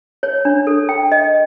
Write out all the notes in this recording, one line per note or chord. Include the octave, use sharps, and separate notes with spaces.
C#5
D4
A4
G5
D#5